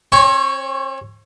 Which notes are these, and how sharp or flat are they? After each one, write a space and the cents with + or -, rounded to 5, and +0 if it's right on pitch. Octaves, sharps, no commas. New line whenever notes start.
C4 +45 C#5 +0